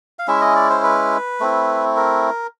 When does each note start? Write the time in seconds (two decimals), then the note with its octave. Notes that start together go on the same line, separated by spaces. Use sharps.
0.19 F5
0.28 G#3 C#4 E4 E5
0.41 D#5
0.56 D5
0.70 C5
0.84 B4
1.40 A3 C4 E4
1.96 A#4